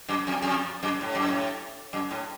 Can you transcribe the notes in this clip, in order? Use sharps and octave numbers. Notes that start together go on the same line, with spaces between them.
F#2
F2
F2
F#2
A2
F#2
A2
F#2
A2